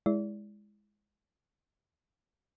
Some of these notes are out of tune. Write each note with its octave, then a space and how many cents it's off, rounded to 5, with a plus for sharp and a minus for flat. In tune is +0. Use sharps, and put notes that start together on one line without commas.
G#3 +0 E4 +0 D5 -30